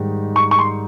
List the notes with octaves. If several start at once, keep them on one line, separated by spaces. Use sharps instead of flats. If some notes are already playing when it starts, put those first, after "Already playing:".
Already playing: G#2 D#3 G3
C#6
C#6
C6